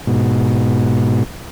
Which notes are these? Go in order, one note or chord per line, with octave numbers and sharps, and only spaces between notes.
G#2 B2